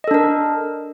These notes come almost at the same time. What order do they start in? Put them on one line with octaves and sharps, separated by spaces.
D#5 A4 D4 A#4